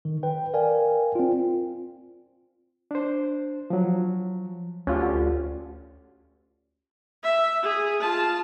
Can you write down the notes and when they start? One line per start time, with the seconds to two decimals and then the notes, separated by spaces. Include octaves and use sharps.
0.05 D#3
0.23 B4 G5
0.54 A#4 D5 F5 G5 G#5
1.15 C4 F4
1.40 F4
2.91 D4 C5
3.70 F3 F#3
4.87 D2 C#4 F4 G4
7.23 E5
7.62 G#4
8.01 F4 A5